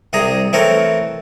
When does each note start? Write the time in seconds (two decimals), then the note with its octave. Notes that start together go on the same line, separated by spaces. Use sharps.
0.13 C2 C3 G#4 A#5
0.53 E3 A3 C4 A#4 C#5